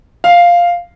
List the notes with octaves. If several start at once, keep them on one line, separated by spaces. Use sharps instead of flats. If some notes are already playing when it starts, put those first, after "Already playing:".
F5